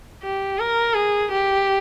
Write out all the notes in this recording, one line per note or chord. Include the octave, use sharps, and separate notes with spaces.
G4
A#4
G#4
G4